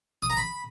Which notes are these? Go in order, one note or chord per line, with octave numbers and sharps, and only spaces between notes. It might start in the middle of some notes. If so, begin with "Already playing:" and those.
D#6
A#5
B5